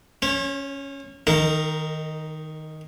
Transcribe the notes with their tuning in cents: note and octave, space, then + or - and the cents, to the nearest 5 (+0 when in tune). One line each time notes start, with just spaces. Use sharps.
C#4 +0 C#5 -45
D#3 +5 D#4 +0 A#4 -40